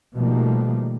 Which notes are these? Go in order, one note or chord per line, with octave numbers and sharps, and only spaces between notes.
B2 D#3 F3 G3 A3 A#3